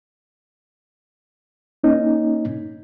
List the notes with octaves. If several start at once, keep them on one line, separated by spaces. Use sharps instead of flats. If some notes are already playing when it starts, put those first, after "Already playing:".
A#3 C#4 D#4